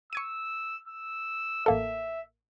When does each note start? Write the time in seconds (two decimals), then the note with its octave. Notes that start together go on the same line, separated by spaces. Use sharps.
0.13 C#6 E6 G#6 D#7
0.88 E6
1.66 A1 A#3 A4 E5